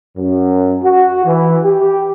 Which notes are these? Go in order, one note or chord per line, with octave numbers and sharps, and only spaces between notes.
F#2
F#4
E3
G4